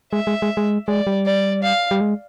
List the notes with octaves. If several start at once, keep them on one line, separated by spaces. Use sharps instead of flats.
G#3 E5
G#3
G#3
G#3
G#3 D5
G3
D5
F5
G3
G#3